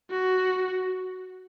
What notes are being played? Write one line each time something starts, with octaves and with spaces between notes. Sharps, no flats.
F#4